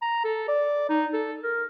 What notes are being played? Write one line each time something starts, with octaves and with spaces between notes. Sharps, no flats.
A#5
A4
D5
D#4
A4
A#4